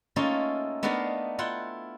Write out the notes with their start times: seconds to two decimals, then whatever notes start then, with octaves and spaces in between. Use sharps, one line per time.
0.16 A3 A#3 C#4 D#4 F4 A4
0.83 A3 B3 D4 D#4 A#4 F5
1.39 E4 F4 F#5 G5